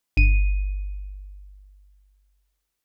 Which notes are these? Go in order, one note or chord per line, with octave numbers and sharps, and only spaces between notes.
G1 D#7